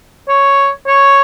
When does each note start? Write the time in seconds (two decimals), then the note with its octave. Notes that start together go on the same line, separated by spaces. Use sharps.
0.28 C#5
0.87 C#5